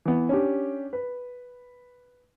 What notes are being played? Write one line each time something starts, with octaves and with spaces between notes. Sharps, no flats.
E3 B3
C#4 D4 G4
B4